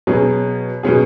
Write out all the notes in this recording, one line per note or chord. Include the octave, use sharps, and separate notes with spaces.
B2 F#3 C#4 G#4
B2 F#3 C#4 G#4